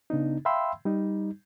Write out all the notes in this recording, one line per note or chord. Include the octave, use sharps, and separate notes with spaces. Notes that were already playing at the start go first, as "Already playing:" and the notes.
C#3 B3 D4 D#4
E5 F5 G5 B5 C6 E6
G3 D#4